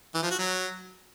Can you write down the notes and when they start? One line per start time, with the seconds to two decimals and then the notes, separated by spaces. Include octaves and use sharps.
0.14 E3
0.23 F3
0.31 F#4
0.39 F#3